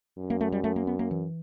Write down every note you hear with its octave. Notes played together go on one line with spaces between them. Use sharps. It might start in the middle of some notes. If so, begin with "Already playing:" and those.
F#2
A#3
A3
G3
A3
A#3
B3
A#3
E3